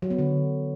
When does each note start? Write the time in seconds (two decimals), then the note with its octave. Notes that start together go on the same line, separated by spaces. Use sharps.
0.02 F#3
0.10 B3
0.19 D3